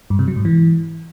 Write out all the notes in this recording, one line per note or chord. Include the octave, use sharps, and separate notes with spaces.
G2
C3
F#3
G#2
E3